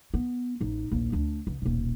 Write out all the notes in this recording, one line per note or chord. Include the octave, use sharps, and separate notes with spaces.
B3
A1 D#4
A#1 D#2
D2 D4
C#2
D#1 B1